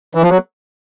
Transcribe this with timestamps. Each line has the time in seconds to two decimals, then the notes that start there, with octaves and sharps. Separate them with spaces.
0.15 E3
0.22 F3
0.30 F#3